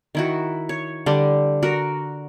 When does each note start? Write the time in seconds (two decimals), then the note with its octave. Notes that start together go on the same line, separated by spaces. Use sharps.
0.15 D#3 E4 F#4
0.69 C#5
1.06 D3 G3
1.63 F#4 A#4